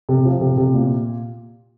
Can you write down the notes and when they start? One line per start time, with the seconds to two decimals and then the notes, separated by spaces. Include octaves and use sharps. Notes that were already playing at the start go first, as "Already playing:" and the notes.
0.09 C3
0.25 F3
0.41 C3
0.58 C3
0.74 A#2